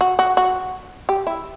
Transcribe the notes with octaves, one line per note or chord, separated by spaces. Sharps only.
F#4
F#4
F#4
G4
E4